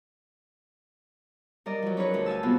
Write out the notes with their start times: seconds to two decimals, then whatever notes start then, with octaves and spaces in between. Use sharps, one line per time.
1.66 G3 A#4 D5 D#5 A#5
1.82 F3 F#3
1.97 C#4 D#4 G#4 A#4 B4 C#5
2.14 D2
2.26 F5 G#5 A5 E6
2.43 C3 G3 B3 C4 F4 F#4